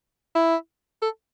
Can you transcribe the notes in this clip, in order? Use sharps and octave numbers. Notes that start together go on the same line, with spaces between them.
E4
A4